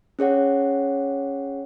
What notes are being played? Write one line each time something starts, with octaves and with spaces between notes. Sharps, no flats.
C#4 G#4 C#5 F#5